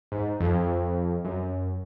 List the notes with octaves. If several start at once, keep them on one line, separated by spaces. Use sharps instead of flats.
G#2
F2
F#2